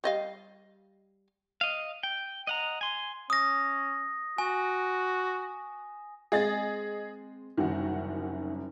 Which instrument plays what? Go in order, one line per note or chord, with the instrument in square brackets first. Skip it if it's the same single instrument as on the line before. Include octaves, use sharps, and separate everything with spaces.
[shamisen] G3 D#5 F5
[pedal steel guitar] D#5 F5
G5
D#5 F#5 A#5
G#5 C6
[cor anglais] C#4 [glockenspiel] D#6 A#6
[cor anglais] F#4 [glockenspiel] G#5
[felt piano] G#3 C4 [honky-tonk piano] G#4 D#5 A6
[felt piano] F#1 C2 F#2 [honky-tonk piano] D#3 F#4